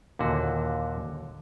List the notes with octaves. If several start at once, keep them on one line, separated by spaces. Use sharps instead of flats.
D#2 A#2 D3 F#4